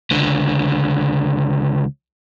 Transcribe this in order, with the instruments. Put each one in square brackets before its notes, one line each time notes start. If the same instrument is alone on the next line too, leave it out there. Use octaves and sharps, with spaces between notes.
[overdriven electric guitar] C#2 D3